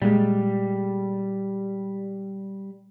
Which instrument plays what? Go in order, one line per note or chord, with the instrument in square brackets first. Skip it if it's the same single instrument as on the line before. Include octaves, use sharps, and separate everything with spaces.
[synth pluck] A#2 G#3 [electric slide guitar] G3